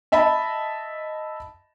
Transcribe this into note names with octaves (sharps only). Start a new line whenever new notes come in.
D#5 E5 A5 B5